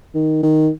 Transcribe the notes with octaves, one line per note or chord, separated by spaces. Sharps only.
D#3
D#3